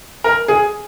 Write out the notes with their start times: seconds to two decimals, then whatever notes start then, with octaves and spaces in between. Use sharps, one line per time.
0.24 A#4
0.48 G#4